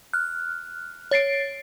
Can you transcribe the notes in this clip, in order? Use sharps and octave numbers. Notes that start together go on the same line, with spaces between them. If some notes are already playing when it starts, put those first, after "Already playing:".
F6 F#6
C#5 A6 C7 D7